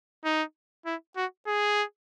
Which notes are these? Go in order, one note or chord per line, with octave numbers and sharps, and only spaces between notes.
D#4
E4
F#4
G#4